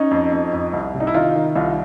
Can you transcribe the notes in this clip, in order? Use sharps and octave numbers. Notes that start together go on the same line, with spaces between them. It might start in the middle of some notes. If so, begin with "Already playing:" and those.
Already playing: C#4 D#4
F2
F2
F2
C2
C3
D#4
E4
D#3 D#4 F4
D#3
C2 D#4 F4